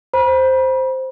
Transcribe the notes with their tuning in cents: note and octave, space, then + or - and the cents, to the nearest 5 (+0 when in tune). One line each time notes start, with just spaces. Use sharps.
C5 +0 B5 -40